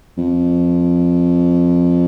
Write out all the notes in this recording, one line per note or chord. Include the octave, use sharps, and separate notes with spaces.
F2